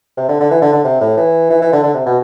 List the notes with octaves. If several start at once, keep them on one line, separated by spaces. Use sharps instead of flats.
C3
D3
D3
E3
D3
D3
C3
A2
E3
E3
E3
D3
D3
C3
B2